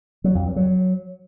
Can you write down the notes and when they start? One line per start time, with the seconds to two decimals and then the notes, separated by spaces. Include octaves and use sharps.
0.24 F#3
0.35 F2
0.46 G2
0.56 F#3